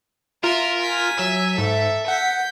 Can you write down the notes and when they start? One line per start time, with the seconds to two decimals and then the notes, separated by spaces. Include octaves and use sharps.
0.44 F4 A#4 E5
0.80 G#5 B6
1.19 F#3 E5
1.58 G#2 A4
2.08 F#5 G6 B6